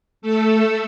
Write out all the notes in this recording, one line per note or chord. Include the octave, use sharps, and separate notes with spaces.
A3 A4